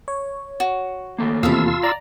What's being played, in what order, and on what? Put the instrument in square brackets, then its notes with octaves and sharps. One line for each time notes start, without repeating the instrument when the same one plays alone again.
[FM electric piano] C#5
[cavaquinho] F#4
[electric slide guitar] D#3 A3 A#3
[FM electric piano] E2 C3 [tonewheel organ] F4 E6 [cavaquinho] F5 A5 B5
[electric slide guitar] D5 [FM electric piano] A#5